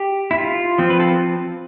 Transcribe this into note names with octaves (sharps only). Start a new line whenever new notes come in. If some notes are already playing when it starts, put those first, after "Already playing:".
Already playing: G4
E4
F4
F3 C4
B4
A4